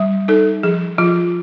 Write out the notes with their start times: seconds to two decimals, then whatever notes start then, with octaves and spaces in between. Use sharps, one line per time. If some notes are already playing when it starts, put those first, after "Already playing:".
Already playing: G3
0.28 D#4 A4
0.63 F3 G#4
0.98 F3 F4